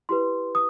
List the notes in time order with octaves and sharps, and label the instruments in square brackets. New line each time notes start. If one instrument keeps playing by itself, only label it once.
[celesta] E4 G4 B4 C6
D#6